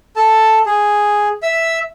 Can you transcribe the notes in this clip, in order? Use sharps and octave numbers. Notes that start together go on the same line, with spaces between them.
A4 A5
G#4
E5 E6